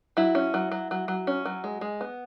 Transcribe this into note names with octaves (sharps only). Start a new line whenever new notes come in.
F#3 E4
C#4
F#3
F#3
F#3
F#3
C#4
F#3
G#3
G#3
B3